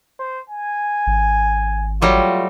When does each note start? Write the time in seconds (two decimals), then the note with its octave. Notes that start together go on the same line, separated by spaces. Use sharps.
0.19 C5
0.50 G#5
1.07 G#1
2.02 F#3 G3 A3 F4